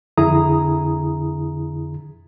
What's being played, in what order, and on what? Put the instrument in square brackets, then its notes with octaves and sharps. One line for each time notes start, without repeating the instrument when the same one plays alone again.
[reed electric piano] F2 D3 E4 G#4 A#5 D#6